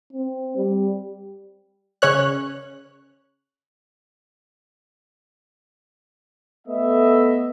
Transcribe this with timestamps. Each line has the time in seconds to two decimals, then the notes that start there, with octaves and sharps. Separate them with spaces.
0.13 C4
0.56 G3
2.02 C#3 C#4 C#5 F#6
6.68 A3 B3 D#5 E5